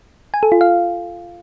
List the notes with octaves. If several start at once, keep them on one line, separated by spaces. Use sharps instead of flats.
G#5
A4
F4
F5